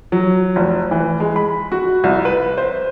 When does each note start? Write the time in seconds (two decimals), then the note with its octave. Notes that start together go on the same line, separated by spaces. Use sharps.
0.12 F#3
0.56 F1
0.91 E3
1.20 G#3
1.36 B5
1.72 F#4
2.04 C2
2.25 B4
2.58 C5